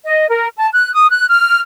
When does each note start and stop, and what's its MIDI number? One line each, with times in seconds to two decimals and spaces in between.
0.04 0.28 75
0.29 0.48 70
0.56 0.67 81
0.74 0.92 90
0.94 1.09 87
1.11 1.27 90
1.28 1.60 89